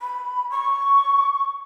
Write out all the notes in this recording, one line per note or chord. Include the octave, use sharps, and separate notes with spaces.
B5
C#6